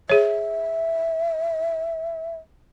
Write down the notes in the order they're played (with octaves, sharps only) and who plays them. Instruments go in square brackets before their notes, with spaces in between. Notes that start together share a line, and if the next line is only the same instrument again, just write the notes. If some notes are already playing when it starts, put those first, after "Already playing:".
[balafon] G#4 C#5 [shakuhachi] E5